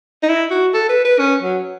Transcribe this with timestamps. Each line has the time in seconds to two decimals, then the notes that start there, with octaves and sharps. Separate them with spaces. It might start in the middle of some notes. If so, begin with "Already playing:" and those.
0.23 D#4
0.29 E4
0.51 F#4
0.74 A4
0.89 B4
1.05 B4
1.19 C#4
1.42 F#3